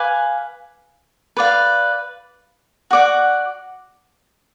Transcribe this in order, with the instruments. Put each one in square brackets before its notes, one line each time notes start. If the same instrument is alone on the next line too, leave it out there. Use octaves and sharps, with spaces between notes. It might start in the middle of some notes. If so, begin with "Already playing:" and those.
Already playing: [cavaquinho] B4 F5 G#5 D6
B4 D5 F5
F#4 D5 F#5